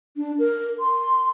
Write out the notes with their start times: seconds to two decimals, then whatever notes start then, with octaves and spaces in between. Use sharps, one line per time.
0.17 D4
0.39 A#4
0.80 C6